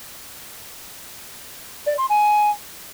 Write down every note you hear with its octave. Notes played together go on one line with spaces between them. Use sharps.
D5
C6
G#5